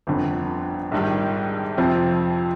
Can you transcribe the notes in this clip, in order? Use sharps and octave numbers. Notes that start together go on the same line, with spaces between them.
G1 F2 D3
A#1 G#2 D#3 G3
F2 C3 F3 C4